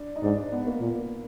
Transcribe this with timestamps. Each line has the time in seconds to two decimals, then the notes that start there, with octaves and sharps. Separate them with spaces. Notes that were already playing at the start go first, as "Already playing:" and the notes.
Already playing: D4
0.16 D#4
0.23 G#2 D4
0.37 D4
0.52 B3
0.67 A#3
0.80 A#2